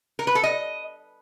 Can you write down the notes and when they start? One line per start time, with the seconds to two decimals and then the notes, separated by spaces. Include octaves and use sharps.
0.19 A#4
0.27 B4
0.35 A4
0.43 D#5